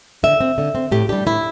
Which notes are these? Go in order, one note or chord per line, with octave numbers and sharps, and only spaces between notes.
D3 E5
C4
D3
C4
A2 G4
G3 D4 G4
A2 E4